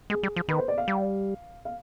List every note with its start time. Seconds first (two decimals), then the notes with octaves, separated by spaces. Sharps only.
0.10 G#3 G#4
0.23 G3
0.36 F3
0.48 D#3 B4
0.59 C5
0.68 D5
0.78 F5
0.88 G3
1.65 F5